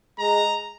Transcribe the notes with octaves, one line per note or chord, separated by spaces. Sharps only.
G#3 A#5